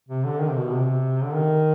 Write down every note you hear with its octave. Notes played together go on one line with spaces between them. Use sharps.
C3
D3
D#3
C3
B2
C3
D3
D#3